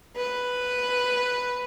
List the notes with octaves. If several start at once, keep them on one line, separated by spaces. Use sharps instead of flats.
B4